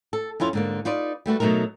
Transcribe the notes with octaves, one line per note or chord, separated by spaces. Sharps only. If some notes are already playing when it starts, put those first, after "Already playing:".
A4
F2 C#4 E4 F4
G#2 D3 A#3
D#4 F4 B4 D5
G3 A3 F#4 B4
B2 F#3 A3 D#4 A#4